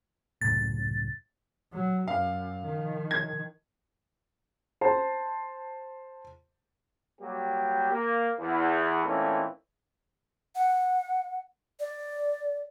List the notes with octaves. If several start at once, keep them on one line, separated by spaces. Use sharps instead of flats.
C#2 F#2 A2 A6
F#3
F#2 F5
D#3 F3
G#6
C5 A5
F#3 G3 A#3 G4
A#3
E2
A#2 E3 A3 C4 C#4 D#4
F#5
D5